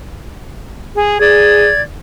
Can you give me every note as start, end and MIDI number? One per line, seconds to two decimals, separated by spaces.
0.95 1.19 68
1.20 1.68 68
1.20 1.80 74
1.20 1.80 92